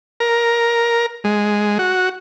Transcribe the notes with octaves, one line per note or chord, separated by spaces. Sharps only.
A#4
G#3
F#4